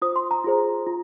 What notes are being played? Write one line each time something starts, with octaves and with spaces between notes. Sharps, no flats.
F4 C5 D#6
C6
A#5
F4 G#4 C5
F4